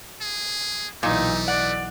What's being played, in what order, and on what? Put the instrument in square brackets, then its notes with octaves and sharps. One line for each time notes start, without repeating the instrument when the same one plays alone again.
[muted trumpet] G#4
[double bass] B1 E3 [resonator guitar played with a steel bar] A#2 [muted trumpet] A3 [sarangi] D#4
[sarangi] D5 [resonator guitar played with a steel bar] F#5